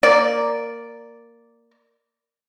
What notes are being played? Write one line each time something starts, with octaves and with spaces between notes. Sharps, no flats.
A#3 D5